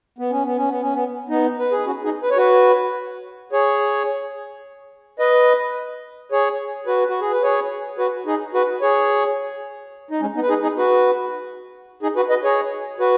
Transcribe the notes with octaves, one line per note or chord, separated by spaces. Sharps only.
B3
C#4
B3
C#4
B3
C#4
B3
B3 D#4
B4
G#4
C#4 F#4
D#4 G#4
B4
C#5
F#4 B4
G#4 C#5
B4 D#5
G#4 C#5
F#4 B4
F#4
G#4
B4
G#4 C#5
F#4 B4
D#4 G#4
F#4 B4
G#4 C#5
D#4
G#3 C#4
B3 D#4
B4
D#4 G#4
D#4 G#4
F#4 B4
D#4 G#4
F#4 B4
B4 D#5
G#4 C#5
F#4 B4